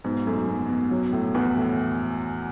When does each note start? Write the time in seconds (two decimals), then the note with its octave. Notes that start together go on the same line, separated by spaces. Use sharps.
0.04 G#2 B2
0.27 F#2 A3
0.48 B2
0.69 B2
0.91 F#3
1.12 A2
1.34 E2 B3
1.56 A2